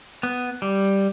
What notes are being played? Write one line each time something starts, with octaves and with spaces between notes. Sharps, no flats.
B3
G3